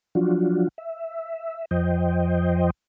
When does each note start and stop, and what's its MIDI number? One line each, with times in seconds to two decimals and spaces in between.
0.15 0.68 53
0.15 0.68 54
0.15 0.68 62
0.15 0.68 65
0.15 0.68 66
0.78 1.65 76
1.71 2.70 41
1.71 2.70 53
1.71 2.70 72
1.71 2.70 75
1.71 2.70 79